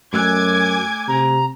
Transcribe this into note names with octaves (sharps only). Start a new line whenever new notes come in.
F#2 A3 G#5 D6 E6 F#6 G#6
C3 A#5